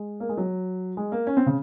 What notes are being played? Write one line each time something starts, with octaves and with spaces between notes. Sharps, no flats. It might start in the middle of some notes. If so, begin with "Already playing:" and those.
Already playing: G#3
A#3
G#3
F#3
G#3
A#3
C#4
C4
C#3